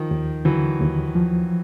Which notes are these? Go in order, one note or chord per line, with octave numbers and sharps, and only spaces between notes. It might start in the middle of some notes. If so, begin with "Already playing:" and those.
Already playing: D#3 F3
D#2
D3 E3 F#3
D#2
F3